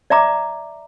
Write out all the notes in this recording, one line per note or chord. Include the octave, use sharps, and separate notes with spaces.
D5 E5 A#5 D6